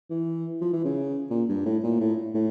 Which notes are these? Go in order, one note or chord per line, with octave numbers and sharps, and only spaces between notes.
E3
F3
E3
C#3
A#2
G2
A2
A#2
A2
A2